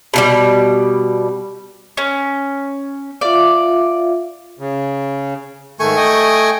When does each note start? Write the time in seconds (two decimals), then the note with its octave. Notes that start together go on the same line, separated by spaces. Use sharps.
0.14 B2 E3 G3
1.97 C#4
3.21 F4 D5 E5 F5
4.59 C#3
5.80 G#2 D#3 A3 G#5 C#6
5.97 D#5 G5 D#6